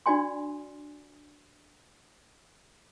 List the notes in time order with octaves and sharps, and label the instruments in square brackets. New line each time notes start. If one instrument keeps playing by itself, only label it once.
[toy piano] D4 F#4 D5 G#5 C6